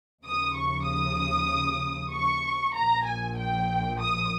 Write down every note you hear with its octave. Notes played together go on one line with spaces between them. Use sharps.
D#2 C#3 F3 D#6
C#6
D#6
C#6
A#1 A#2 F3 A#5
G#5
G5
D#6